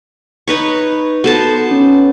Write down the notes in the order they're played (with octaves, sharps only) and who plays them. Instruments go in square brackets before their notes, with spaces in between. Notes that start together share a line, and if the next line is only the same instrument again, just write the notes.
[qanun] D#4 B4 C#5
[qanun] B3 C5 A5 [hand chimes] F#4 A4
[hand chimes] C#4